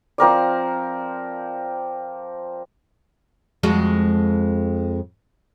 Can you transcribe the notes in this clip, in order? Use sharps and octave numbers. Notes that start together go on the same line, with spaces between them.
F3 C4 A#4 D5
F2 G#3 F#4